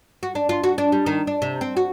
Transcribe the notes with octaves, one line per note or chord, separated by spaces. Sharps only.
F#4
D4
F4
F#4
D4
G3
D#3
D4
C3
C4
F#4